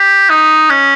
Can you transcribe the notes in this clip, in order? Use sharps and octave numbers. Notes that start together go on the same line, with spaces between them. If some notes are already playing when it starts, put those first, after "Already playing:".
Already playing: G4
D#4
C#4